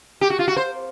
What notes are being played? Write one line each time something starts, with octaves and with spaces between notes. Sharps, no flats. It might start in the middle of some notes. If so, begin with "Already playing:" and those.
G4
F#4
F4
F#4
C5